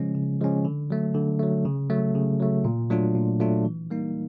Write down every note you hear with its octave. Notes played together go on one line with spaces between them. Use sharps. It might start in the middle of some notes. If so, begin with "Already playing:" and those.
Already playing: C#3 F3 G#3 C#4
C#3
F3 G#3 C#4
D3
F#3 A3
D3
F#3 A3
C#3
F#3 A3
C#3
F#3 A3
A#2
F#3 A3 D4 F4
A#2
F#3 A3 D4 F4
E3
G3 A#3 D#4